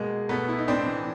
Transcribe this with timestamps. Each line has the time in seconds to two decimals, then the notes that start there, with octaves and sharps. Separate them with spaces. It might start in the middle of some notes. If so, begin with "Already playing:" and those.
Already playing: B2 G#3 A#3
0.29 B2 A3 B3
0.48 E4
0.58 D#4
0.68 A2 C4 D4
0.86 E3